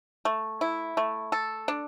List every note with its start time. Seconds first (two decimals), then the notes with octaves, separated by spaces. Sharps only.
0.25 A3
0.61 E4
0.97 A3
1.32 A4
1.68 D4